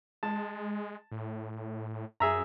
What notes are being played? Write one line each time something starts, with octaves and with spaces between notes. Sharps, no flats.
G#3 A5
A2
F#2 G#4 E5 A#5